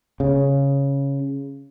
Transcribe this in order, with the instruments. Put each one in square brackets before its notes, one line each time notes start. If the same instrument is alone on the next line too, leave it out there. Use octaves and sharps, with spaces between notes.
[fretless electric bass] C#3